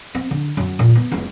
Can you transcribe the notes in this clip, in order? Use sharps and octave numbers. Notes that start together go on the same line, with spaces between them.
C4
D3
F#2
A#2
B3
F#1 C#2